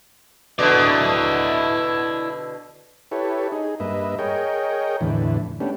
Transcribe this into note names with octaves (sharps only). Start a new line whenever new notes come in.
B2 D3 E4 D5
E4 G4 A4 B4 C#5
D#4 G#4
G2 A#3 B4 D#5 E5
G#4 A#4 C#5 D#5 G5
E2 A2 D3 E3
A3 B3 C#4 D4 G4